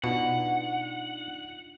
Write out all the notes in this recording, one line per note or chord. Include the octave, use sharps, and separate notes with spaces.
B2 D4 D#4 F4 F#5